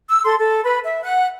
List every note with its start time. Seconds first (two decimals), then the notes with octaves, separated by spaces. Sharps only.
0.08 E6
0.24 A4 C6
0.39 A4
0.63 B4 B5
0.84 E5
1.04 F#5 F#6